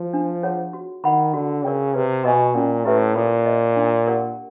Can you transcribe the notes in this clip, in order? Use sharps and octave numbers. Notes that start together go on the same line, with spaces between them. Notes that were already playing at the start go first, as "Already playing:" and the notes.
Already playing: F3
D4
F4 G#4 C#5 F#5
F#4
D#3 A#4 D5 F#5 B5
D3 F#4
C#3 A#4 D5 G5
C3 B4
B2 D#5 G#5 C#6
A#2 C#4
A2 E4 G4 B4 E5
A#2 A4
C5 D#5
D4
G4 A#4 D5 F#5